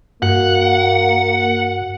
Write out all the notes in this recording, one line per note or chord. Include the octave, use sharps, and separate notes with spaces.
G2 A#3 F#4 F#5